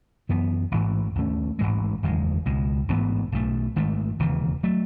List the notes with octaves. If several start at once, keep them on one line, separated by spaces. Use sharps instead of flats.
F#2 E3 B3
A1 G#2 E3
D#2 D#3 A3 C#4
A1 G#2 E3 G#3
F#1 E2 D#3 G#3
C#2 B2 G#3
A1 G#2 E3 B3
B1 B2 A3
G#1 G#2 D#3 A3
E1 D#2 C#3 E3
F#3 A3